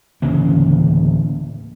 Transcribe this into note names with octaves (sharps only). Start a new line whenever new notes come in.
D1 C#3 E3 A#3